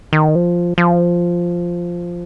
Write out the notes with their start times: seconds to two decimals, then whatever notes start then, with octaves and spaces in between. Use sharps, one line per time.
0.13 D#3
0.35 F3
0.78 F3